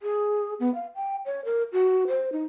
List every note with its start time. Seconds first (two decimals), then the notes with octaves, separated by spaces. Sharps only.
0.02 G#4
0.60 B3
0.75 F5
0.95 G5
1.26 C#5
1.45 A#4
1.72 F#4
2.08 C5
2.32 D#4